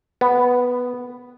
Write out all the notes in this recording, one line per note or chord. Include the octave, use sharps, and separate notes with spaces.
B3